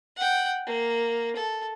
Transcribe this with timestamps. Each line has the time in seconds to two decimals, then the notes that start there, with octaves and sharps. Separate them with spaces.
0.16 F#5 G5
0.66 A#3
1.36 A4